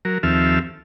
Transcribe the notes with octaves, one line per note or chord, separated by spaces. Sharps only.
F#3 A#4
D#2 F3 C4 A4 E5 F6